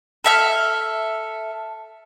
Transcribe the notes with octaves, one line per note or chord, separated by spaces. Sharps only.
A4 E5 F6